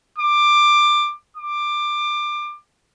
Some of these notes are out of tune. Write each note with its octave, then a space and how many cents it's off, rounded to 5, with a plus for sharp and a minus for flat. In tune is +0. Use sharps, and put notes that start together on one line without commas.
D6 +15
D6 +20